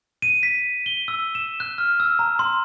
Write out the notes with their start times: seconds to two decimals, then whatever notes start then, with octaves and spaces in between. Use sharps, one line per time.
0.22 D#7
0.43 B6
0.86 G7
1.08 E6
1.35 E7
1.60 F#6
1.78 F6
2.00 E6
2.19 A#5
2.39 C6